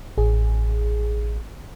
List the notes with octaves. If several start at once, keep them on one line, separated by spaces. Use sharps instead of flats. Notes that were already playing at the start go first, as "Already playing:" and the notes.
A1 G#4